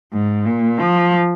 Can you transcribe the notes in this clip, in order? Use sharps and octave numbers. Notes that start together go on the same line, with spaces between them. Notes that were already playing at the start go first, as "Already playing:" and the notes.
G#2
A#2
F3